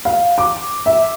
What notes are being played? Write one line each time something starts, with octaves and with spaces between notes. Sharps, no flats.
F5
D6
E5